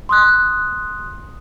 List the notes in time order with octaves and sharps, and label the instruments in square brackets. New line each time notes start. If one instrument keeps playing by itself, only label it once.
[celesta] C6 D#6 F#6